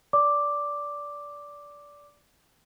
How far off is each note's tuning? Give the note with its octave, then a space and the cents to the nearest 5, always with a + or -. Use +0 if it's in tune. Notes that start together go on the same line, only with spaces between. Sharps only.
D5 -20 D6 +0